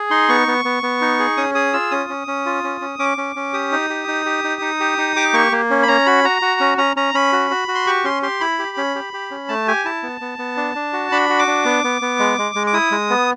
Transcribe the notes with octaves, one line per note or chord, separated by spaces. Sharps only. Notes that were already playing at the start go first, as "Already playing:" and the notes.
Already playing: G#4
D#4 C6
B3 C#6
B3
B3
B3
D#4
G#4
C#4 D#6
G#4 D#6
F4 E6
C#4 D#6
C#4
C#4
F4
C#4
C#4
C#4 D6
C#4
C#4
G4 D#6
D#4
G4
D#4
G4
D#4
D#4
G4
D#4
G4 D6
A#3 C#6
A#3
C#4
B5
C#4 A#5
F#4 B5
F#4 A#5
F#4
C#4
C#4 A#5
C#4 A#5
C#4 B5
F#4
F#4
F#4
C6
G4 C#6
C#4 C6
G4 C6
E4 B5
G4
C#4
G4
G4
C#4
A3 A5
G4 G#5
E4 A5
B3
B3
B3
D4
D4
F#4
D4 B5
F#4
D6
D4
B3
B3
B3
G#3
G#3
G#3
D6
E4 D#6
G#3
B3